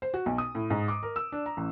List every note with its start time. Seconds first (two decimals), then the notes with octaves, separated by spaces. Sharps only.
0.02 C5
0.14 F#4
0.26 B1
0.38 D#6
0.55 A2
0.70 G#2
0.88 D6
1.03 A#4
1.16 E6
1.32 D4
1.46 A#5
1.57 A1